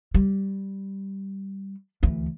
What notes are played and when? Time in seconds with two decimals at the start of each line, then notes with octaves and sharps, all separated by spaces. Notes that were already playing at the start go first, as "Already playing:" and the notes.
0.14 G3
2.03 D2 E3